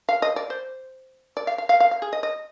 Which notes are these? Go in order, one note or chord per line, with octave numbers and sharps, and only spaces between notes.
F5
D#5
D5
C5
D5
F5
F5
F5
F5
F5
G#4
D#5
D#5